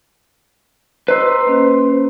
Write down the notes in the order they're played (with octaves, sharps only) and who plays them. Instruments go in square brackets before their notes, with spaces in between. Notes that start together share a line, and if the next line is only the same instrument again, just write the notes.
[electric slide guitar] B4 C5 [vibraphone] D#5 A#5 E6
[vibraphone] A#3 C#4